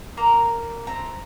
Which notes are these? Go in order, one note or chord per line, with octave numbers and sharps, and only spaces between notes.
A#3 A#4 A#5
A3 C4 A#5